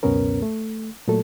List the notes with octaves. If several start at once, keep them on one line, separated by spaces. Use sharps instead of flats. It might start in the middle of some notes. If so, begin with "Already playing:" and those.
C#2 F#2 B2 B3 C#4 A#4
A3
A#2 F#3 A3 A4